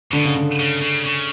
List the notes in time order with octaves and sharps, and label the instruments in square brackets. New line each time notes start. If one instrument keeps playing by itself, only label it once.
[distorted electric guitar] B2 [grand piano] D3
[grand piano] C#3
D3
[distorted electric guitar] C#3
C#3
C#3